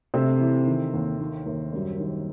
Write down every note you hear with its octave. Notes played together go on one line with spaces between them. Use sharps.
C3 A3 C4
E3
D#3
D#2
D#3
D#2
F#2 G3
D#3